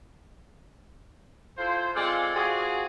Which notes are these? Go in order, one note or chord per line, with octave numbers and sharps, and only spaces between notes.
E4 F4 A4 C5
G#3 C4 F4 A4 D5 F5
C4 F4 F#4 G#4